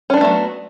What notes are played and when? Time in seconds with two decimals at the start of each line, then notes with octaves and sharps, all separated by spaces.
0.10 C#4
0.14 D4
0.17 B3
0.21 A3
0.25 F#3